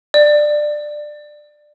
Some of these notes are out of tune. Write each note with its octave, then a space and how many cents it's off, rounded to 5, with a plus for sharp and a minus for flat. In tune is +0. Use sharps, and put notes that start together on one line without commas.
D5 +15